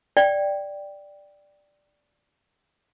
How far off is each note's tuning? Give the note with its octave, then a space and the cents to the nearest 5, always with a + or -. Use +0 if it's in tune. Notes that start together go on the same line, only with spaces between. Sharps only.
D5 +0 G5 +0